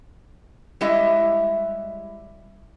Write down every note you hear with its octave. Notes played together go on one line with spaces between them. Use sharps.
G3 G#3 E4 G4 D#5 E5